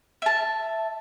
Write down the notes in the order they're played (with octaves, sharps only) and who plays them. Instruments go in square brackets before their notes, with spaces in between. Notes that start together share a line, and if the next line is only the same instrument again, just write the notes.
[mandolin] E5 A5